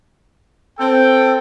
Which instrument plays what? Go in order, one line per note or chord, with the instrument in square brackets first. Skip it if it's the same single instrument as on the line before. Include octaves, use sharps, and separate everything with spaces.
[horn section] C4 G5 [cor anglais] A4